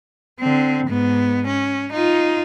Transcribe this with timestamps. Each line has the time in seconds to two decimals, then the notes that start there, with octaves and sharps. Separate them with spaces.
0.39 D3 C4
0.87 G#2 B3
1.47 C#4
1.93 D#4 F4